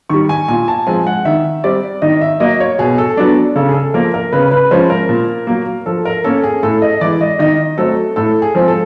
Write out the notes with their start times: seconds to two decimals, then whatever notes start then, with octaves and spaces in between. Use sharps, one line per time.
0.09 D#3 G3 C#6
0.29 G#5
0.48 A#2 G#5
0.68 A5
0.87 F3 G#3 C4 G#5
1.07 F#5
1.25 D#3 E5
1.64 G3 C4 D5
2.02 D#3 D#5
2.21 E5
2.40 F#3 A#3 D#5
2.60 C#5
2.79 B2 G#4
2.98 A4
3.17 F#3 B3 D4 D5
3.56 C#3 A4
3.69 G#4
3.74 A4
3.94 F3 A#3 A#4
4.14 A#4
4.32 C#3 B4
4.51 B4
4.71 F3 G#3 C#4 C5
4.90 A#4
5.09 A#2
5.47 F#3 A#3
5.86 F3 A4
6.05 A#4
6.24 A#3 C#4 A4
6.44 G#4
6.63 A2 A4
6.82 D#5
7.01 E3 G#3 D5
7.21 D#5
7.39 D#3 D#5
7.78 F#3 A3 C4 A4
8.16 A2 A4
8.42 G#4
8.55 F3 G#3 C4
8.68 A4